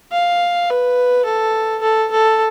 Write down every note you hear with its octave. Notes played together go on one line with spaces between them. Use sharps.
F5
B4
A4
A4
A4